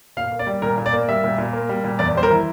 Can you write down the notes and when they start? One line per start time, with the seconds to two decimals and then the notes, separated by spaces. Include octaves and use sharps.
0.17 A#2 F5
0.32 A#3
0.39 D5
0.47 G3
0.62 A#2 A#4
0.78 A#2
0.86 D5
0.93 A#3
1.09 G3 E5
1.24 A#2
1.38 A#2
1.53 A#3
1.69 G3
1.84 A#2
1.99 E2 D5
2.15 G3 C5
2.23 A#4
2.30 E3